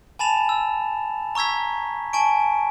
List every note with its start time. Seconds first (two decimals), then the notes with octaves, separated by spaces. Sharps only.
0.19 G#5 A5 B5 A6 E7 F7
0.49 E6
1.35 A#5 C#6 E6 G#6 B6
2.13 G#5 A5 C#6 D7